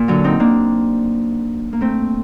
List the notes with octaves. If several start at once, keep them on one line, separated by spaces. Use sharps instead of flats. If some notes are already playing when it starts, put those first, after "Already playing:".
Already playing: A#2
D3 F#3
C4 D#4
A#3 D4
A#3
A3 C4